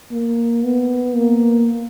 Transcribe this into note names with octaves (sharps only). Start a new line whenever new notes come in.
A#3
B3
A#3